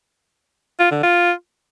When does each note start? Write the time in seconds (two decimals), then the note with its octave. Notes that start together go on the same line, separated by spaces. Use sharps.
0.79 F4
0.91 D3
1.03 F4